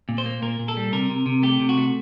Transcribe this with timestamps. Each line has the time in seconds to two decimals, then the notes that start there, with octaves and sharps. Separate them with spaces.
0.09 A#2
0.18 C5
0.26 A#3
0.42 A#2 A#4
0.59 A#2
0.68 A4
0.77 G3
0.93 C3 A#4
1.10 C3
1.26 C3
1.43 A3 G4
1.60 C3
1.69 F#4
1.78 A3